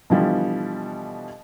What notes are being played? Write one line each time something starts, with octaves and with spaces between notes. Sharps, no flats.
B2 D3 E3 F3 G3